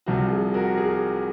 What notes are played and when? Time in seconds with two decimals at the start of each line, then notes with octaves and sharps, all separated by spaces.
0.06 C2 C3 F3 F#4
0.31 G#4
0.54 F#4 A#4
0.77 G#4